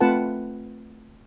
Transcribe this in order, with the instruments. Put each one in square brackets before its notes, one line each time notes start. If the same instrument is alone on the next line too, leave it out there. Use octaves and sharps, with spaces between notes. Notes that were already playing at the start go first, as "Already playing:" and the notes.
[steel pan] A3 C4 F4 B4 F#5 A5